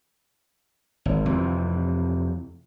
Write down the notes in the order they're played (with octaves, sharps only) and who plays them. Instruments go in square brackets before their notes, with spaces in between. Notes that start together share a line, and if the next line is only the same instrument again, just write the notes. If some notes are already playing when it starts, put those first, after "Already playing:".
[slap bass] G#1
F2 C3 E3